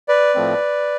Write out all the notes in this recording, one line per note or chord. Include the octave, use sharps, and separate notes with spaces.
B4 D5
A2 F3 A3 C4